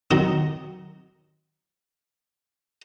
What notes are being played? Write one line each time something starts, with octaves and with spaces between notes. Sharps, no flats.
D#3 F#3 C4 D#4